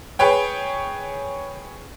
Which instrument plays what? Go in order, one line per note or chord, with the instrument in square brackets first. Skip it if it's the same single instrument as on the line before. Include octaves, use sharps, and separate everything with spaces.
[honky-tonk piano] G#4 B4 C#5 G5